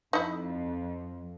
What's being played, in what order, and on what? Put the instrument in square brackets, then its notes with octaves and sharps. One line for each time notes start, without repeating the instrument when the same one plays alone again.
[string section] F2 [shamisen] D#4 E4